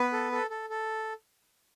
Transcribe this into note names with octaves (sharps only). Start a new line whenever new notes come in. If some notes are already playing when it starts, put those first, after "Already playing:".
Already playing: B3 B4
A4
A4
A4
A4